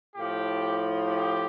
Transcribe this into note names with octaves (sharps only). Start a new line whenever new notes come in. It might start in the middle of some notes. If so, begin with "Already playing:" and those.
A2 F3 G4
G4